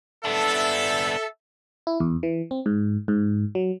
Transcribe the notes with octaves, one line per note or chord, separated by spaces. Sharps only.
B3 D4 A4 E5
E4
E2
E3
C4
G#2
G#2
F#3